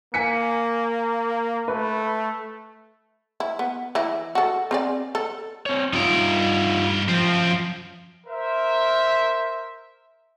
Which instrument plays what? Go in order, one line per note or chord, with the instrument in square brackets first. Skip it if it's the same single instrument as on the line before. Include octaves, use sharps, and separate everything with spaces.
[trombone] A#3 [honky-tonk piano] G#5 B6 C#7
[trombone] A3 [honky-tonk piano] B4
[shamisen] E4
B3
E3 E4
F#4 A4
C4 G#4 D5
A4
[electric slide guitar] C4 C#5
[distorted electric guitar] G2 A#4 [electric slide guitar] D#4 F4
[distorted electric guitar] F#2 C4 [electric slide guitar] F3
[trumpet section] A#4 C5 E5